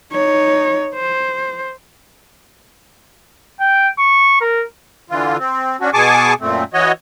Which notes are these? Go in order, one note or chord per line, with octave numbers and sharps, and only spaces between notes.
D#4 C#5
C5
G5
C#6
A#4
D3 E3 F4
C4
C#4 D4 F#4
B2 G#4 G#5 A5 C#6 D6
F#2 A#2 A3 C4
E3 F#4 C#5 D#5